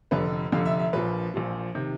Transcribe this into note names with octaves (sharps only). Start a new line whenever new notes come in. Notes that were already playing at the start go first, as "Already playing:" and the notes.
F1 F2 D3 B4
F1 F2 D3 F5
E5
E5
A#1 A#2 F3 B4
A#1 A#2 F3
C3 D#3